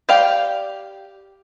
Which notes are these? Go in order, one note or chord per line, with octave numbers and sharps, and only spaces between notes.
G4 D5 F5 G5